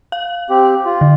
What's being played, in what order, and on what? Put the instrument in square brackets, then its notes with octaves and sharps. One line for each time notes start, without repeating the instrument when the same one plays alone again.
[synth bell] F5
[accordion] C4 G4
F4
[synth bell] D3